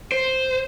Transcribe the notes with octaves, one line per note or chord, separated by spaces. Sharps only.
C5